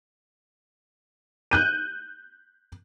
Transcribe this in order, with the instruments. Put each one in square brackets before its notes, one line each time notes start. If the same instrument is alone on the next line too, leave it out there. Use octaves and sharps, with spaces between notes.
[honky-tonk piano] F#6 G6 D#7